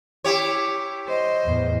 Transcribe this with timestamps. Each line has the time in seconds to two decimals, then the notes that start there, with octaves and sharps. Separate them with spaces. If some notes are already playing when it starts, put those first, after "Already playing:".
0.24 E4 G4 C#5
1.07 C5 D#5
1.43 E2 A2